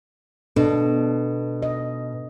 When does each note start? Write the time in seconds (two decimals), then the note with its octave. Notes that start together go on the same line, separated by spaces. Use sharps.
0.56 B2 D4 A4
1.62 D#5